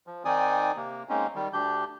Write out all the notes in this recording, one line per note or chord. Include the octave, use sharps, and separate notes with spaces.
F3
D#3 C4 D#4 D5 G#5 D#6
C3 A#3
G#3 A#3 C4 C#4 D#4
D#3 G3
D2 D4 G4 G6